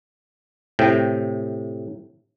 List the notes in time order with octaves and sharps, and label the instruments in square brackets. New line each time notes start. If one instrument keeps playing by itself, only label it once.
[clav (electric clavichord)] A2 C3 G5